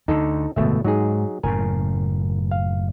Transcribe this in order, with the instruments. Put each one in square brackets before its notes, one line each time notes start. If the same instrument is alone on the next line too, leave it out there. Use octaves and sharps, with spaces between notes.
[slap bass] D2 D3 [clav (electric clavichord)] D#4 A4
[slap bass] D1 G1 G#3 [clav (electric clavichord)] B2 A3 E5
[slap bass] G#2 [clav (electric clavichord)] F#3 D#4 G#4
[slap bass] F#1 A2 C#3 [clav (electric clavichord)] A#4 G#5
[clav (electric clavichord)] F5